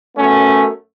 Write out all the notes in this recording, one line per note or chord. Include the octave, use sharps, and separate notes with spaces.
F#2 A3 B3 C#4